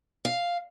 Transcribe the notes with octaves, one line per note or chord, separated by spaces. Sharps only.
F5